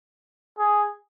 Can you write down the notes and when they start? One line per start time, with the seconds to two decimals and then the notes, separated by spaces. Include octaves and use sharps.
0.59 G#4